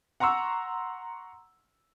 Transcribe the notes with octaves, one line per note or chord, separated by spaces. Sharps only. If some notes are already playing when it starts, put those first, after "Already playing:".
F#5 A#5 C6 C#6 E6